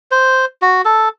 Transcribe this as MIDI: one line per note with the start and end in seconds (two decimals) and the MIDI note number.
0.11 0.45 72
0.62 0.82 66
0.85 1.09 69